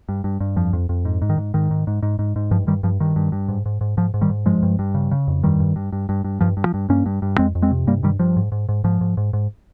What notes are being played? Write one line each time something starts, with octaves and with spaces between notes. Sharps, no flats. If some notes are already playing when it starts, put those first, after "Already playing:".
G2
G2
G2
F2 F3
F2
F2
G#2
G#2
D#3
G#2
G#2 D#3
G#2
G#2
G#2
G#2
G#2
G2 F3
G2 D#3 G3
G2 F3
G2 D#3
G2
G2
G#2
G#2
G#2
G#2 F3
G#2
D#3 G3
G#2
G2 F3 G#3
G2
G2
C#3
C#3
F2
G2 D#3 G3
G2
G2
G2
G2
G2
G2 F3
G2
F3
G2
G2 A#3 C#4
G2
G2
F2 G#3 C4
F2
G#3 C4
C3
G2 G3 A#3
G2 D#3 G3
G2 F3
G#2
G#2
G#2
G#2 F3
G#2
G#2
G#2